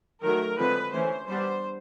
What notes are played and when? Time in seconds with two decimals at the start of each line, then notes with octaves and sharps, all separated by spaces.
0.23 D#3 F#3 A3 A#4
0.58 D3 F3 G#3 C4 B4
0.92 E3 A3 C#4 C5
1.28 G3 B3 D4 C5